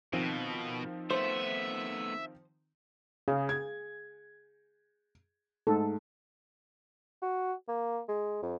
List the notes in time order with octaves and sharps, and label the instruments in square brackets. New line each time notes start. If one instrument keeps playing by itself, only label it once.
[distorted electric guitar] B2 [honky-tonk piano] D#3 F3 C4
[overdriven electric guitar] A3 B3 [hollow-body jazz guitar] C5 [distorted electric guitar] E5
[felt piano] C#3 [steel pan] G#4 F5
[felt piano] G#6
[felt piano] G#2 [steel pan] A3 D#4 A4
[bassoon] F#4
A#3
G#3
F2